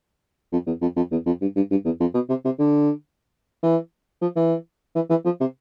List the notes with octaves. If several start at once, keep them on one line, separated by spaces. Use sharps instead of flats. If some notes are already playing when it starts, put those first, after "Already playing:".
F2
E2
F2
F2
E2
F2
G2
G2
G2
E2
F2
B2
C3
C3
D3
E3
F3
E3
E3
E3
F3
C3